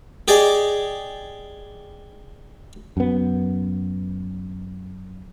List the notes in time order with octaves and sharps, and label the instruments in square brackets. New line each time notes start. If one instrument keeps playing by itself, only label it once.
[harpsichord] G4 G#4 D5 D#5
[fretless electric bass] F#2 B3